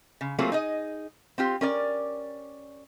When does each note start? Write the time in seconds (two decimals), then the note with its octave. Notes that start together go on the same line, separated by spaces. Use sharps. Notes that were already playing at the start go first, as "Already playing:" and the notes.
0.21 C#3
0.38 F#3 A3 A#3 C4 F4 G#4
0.52 D#4 G#4 D#5
1.38 C4 F4 G4
1.61 C#4 A#4 D5